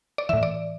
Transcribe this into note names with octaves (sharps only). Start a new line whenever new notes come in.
D5
A2 E3 E5
D5